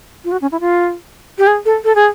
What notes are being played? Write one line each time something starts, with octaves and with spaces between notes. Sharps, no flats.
F4
F#4
C#4
E4
F4
G4
G#4
A4
A4
G#4